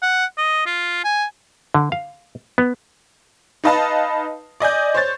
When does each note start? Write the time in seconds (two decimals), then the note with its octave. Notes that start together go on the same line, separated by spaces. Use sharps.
0.02 F#5
0.38 D#5
0.66 F4
1.05 G#5
1.74 D3
1.92 F5
2.58 B3
3.64 D#4 B4 D#5 F5 A5 B5
4.60 D5 D#5 G#5 G6
4.94 C5 C#5 G6 A6